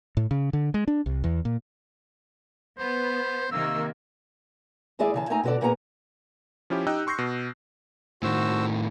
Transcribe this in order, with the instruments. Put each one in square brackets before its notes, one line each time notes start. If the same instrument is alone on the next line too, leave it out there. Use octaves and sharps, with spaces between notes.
[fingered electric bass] A2
C#3
D3
G#3
D4
C2
E2
A#2
[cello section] B3 [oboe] C5
[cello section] C3 D#3 A#3 [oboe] E6
[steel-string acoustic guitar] D#2 G#3 E4 G#4 D5 E5
C#3 E3 A5
A3 C4 D#4 G#5 A#5
B2 D3 F#4 A4 D5
A#2 A#3 B3 G#4 F#5 A#5
[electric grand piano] F3 C#4 E4 G4
D#4 G4 D#5 G5 E6 F#6
C6 C#6 G6 A#6 C7
B2
[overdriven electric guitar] A2 D#3 [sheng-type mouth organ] F#4 C5 E6